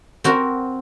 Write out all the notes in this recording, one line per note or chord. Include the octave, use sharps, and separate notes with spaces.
C4 F#4 A#4